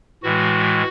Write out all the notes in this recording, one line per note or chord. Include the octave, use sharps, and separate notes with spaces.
A2 E3 G#3 F#4